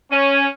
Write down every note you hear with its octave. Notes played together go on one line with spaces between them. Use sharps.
C#4